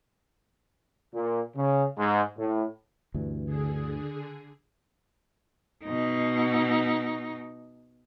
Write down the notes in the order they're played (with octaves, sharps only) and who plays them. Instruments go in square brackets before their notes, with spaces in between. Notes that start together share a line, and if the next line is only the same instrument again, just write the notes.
[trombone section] A#2
C#3
G#2
A2
[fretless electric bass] D2 G2 E3
[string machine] D3 G#4
[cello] B2 D#4